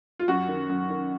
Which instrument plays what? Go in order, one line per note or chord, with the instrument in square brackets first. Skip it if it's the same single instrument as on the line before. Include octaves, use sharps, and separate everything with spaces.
[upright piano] F4
F#2 F#4
D#3
F#2
D#3